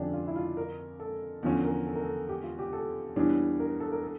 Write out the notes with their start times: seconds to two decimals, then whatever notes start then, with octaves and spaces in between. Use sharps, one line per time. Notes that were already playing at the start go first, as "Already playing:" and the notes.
Already playing: F2 D3 F3 C#4 D4 G4
0.13 F4
0.28 E4
0.36 F4
0.57 A#4
1.00 A4
1.43 E2 D3 F3 C#4
1.64 A#4
1.87 A4
1.96 A#4
2.04 A4
2.29 G4
2.43 F4
2.59 G4
2.73 A4
3.16 E2 E3 G3 D4 C#5
3.60 A#4
3.80 A4
3.92 A#4
4.03 A4